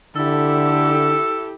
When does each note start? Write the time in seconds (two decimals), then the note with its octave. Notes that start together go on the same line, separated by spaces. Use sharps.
0.16 D3 E4 G4 A4